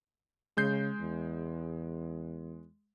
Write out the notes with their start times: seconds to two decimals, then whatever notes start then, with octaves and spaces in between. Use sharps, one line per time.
0.57 C#3 G#3 G6 C7
1.00 E2